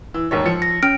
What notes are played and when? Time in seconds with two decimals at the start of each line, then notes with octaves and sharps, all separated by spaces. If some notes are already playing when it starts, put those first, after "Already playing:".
0.14 E3 E6
0.31 E1 D#2 C#5
0.46 F3 C#7
0.62 A#6
0.83 C#4 G5 F6 D7